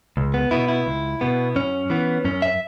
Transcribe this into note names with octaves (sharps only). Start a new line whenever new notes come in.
C#2
B3
B2 B3 E4
E4
C#2
B2 B3
F#2 C#4
E3 B3
F#2 C#4
E5